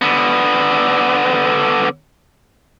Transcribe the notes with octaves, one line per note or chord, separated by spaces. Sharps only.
D3 B3